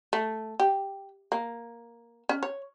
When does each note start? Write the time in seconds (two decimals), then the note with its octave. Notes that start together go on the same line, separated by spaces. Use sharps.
0.13 A3
0.60 G4
1.32 A#3
2.29 C#4
2.43 C#5